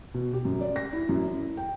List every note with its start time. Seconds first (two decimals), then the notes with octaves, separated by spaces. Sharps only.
0.14 B2
0.33 G4
0.45 F#2
0.61 D5
0.76 A#6
0.93 E4
1.09 F#2
1.26 E4
1.57 G5